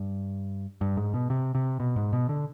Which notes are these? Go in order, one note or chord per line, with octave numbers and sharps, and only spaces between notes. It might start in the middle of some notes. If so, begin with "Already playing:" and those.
Already playing: G2
G2
G#2
B2
C3
C3
B2
G#2
B2
D3